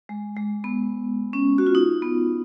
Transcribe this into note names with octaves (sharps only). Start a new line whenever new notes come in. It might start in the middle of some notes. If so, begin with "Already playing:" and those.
G#3
G#3
B3
C#4
F#4
F4
D#4
B3